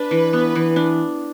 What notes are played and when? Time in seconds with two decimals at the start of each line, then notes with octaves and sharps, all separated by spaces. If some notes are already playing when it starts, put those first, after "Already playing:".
Already playing: D4 B4
0.11 E3
0.33 B3
0.55 E3
0.76 D4